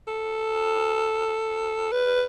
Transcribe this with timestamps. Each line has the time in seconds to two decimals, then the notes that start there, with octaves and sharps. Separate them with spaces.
0.08 A4
1.92 B4